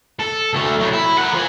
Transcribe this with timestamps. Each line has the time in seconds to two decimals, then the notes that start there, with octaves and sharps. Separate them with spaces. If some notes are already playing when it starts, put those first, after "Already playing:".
0.19 A4
0.53 D2 A3
0.80 A2 F#3
0.92 E4
1.18 A#4 F#5
1.33 F3 G#5